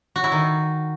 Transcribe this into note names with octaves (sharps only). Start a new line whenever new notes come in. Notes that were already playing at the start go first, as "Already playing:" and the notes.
F#4
E4
D#3